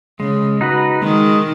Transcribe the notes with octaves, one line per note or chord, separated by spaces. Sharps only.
C#3 G#3
D#4 F#4 B4
D#3 G#3